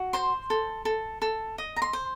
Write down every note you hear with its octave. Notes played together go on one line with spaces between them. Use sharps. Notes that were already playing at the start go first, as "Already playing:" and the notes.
Already playing: F#4
C5 C6
A4
A4
A4
D#5
A#5
C6
C5